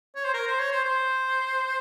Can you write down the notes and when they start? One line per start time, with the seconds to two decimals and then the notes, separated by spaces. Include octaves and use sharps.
0.15 C#5
0.24 C5
0.34 A#4
0.47 C5
0.59 C#5
0.72 C5
0.84 C5